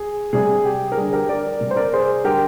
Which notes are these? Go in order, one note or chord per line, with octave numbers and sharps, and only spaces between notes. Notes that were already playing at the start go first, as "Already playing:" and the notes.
Already playing: G#4
C3 G3 G#4
G4
A#4
D3 G3 G#4
G4 A#4
A#4 D5
C3 G3
C5
A#4 D5
G#4 C5
D3 G3 G4 A#4